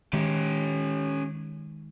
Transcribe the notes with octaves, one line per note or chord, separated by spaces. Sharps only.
D#3 G#3 C#4 G4